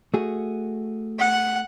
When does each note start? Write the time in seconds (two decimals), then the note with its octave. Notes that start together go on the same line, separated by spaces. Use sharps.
0.14 A3 F#4 G#4
1.19 F#5